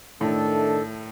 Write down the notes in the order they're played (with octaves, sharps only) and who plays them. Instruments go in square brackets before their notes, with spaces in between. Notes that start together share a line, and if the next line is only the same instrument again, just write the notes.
[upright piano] A2 [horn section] D#3 A3 D4 A4